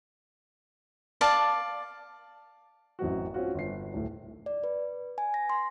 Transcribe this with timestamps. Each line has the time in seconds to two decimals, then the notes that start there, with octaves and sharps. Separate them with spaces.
1.21 D5 F5 A5
2.99 A1 F#2 C4 F#4
3.34 C4 C#4 F4 F#4
3.55 G1 C7
3.94 D1 A2
4.46 D5
4.64 B4
5.18 G#5
5.34 A#6
5.50 C6